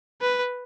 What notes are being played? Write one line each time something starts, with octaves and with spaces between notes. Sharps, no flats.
B4